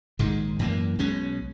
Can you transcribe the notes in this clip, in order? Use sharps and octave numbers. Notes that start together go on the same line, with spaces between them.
A#1 G#2 D#3 G#3
F#2 E3 A#3
B1 B2 G#3 C#4